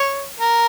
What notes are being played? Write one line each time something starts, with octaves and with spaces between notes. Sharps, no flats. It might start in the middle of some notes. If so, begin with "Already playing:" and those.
Already playing: C#5
A#4